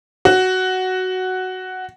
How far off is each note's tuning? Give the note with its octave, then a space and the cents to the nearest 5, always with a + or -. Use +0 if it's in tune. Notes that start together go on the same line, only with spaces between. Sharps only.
F#4 +5